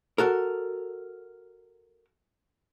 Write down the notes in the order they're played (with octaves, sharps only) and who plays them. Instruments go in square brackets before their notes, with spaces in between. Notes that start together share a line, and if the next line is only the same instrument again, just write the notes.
[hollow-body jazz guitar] F#4 A4 A#4